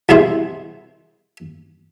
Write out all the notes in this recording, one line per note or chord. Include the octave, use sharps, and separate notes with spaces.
C2 B2 E4 G#4 C5